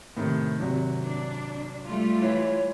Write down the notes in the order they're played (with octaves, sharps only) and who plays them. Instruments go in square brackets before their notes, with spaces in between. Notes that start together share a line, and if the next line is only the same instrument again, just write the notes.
[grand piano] A2 C3 D#3
G#1 C3 F#3
[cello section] D4
G3 A3 F4
[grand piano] E3 [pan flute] C#5